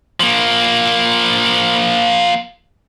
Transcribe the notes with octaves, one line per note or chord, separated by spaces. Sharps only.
F3 A#3